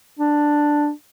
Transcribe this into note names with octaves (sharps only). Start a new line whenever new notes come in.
D4